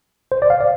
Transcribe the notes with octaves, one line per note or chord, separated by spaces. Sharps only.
C5
D5
F5
D5